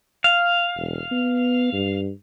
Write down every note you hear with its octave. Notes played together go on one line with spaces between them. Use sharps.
F5
E1
B3
G2